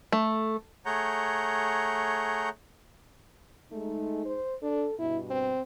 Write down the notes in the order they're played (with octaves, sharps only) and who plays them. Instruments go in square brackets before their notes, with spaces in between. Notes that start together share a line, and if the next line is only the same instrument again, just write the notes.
[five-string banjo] A3
[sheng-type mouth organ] A3 G#4 C#5 F#5 A#5 G6
[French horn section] G#3 D#4 [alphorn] A3
[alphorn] C5
[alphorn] D4 [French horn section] A4
[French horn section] G2 B2 [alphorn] E4
[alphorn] C4